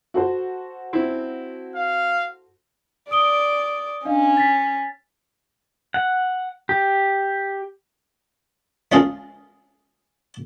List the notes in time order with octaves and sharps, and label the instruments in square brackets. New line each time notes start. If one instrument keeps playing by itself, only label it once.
[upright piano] F#4 A4 C5
[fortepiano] C4 E4
[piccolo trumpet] F5
[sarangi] D5 [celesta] D#6 D7 G7
[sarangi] C#4 [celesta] D4 D#5 F5
[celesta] A6 B6
[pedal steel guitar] F#5
G4
[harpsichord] G#3 C#4 F4 G#4 A4 F5